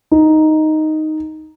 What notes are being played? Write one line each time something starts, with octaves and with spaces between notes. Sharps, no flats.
D#4